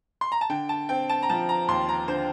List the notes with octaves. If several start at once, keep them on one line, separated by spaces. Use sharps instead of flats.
C6
A#5
A5
D3 G5
A5
C4 G5
A5
A#5
F3 A5
A#5
D#2 C6
A#5
D3 C5